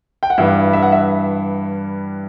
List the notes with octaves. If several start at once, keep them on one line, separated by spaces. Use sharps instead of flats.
G5
F#5
G2 E3 G3 E5
E5
F#5
E5